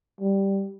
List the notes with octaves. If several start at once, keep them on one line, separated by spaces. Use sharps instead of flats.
G3